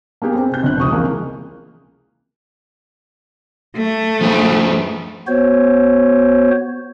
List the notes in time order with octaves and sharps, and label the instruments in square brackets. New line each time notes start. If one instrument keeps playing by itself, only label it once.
[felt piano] A#3 B3 G4 G#4
C4
C3 G6
G1 C3 F#6
F1 C#2 C#6 D#6
C#2 C3 E3 F3 G#3 A#3
[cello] A3
[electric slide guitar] F3 G#4 B4
[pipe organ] B3 F#4 C5 C#5